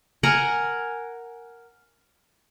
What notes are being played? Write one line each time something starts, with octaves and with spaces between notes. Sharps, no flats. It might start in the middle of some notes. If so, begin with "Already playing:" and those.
A#4 F#5 G#5 A#5